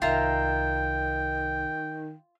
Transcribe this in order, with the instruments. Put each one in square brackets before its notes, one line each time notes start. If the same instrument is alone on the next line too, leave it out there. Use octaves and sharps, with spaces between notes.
[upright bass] C2 [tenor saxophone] D#3 [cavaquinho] F4 E5 A#5 [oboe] G5